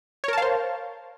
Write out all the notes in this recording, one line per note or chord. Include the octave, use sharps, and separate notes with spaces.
A#4 C5 C#5 F5 A5